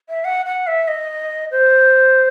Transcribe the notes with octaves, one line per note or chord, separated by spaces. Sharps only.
E5
F#5
F#5
E5
D#5
C5